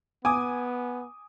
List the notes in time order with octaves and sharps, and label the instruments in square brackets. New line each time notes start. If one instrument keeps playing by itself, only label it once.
[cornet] B3 [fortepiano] G#5 [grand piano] D6 D#6